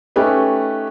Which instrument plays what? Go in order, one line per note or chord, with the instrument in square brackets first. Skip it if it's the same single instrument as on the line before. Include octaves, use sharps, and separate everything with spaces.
[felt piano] A3 C#4 D#4 G4 B4